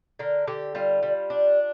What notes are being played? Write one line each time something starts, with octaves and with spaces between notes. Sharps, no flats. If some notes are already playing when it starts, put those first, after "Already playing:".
D3 A#4
D3 G4
G3 F4
G3
D4